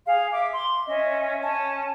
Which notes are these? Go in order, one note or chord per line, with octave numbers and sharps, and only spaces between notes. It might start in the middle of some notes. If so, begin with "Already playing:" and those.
G#4 F5
E5 D6
C6
C#4 D#5 E5
C#4 A5